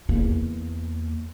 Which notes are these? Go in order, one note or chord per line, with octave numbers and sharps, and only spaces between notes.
E2 A#3